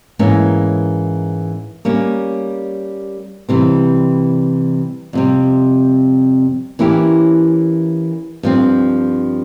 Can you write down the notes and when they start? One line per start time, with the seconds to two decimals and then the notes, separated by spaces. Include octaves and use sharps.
0.19 G#2 E3 A#3 C#4
1.85 G3 A#3 C#4
3.49 C3 E3 G3 C4
5.13 F2 C3 G3
6.79 E3 A#3 C#4 E4 G4
8.43 G2 F3 C4